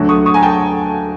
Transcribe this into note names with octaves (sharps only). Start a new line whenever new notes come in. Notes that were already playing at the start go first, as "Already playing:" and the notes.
Already playing: D2 D3 F#3 A3
C#6 D#6
C#6 D#6
G#5 A#5
G5 A5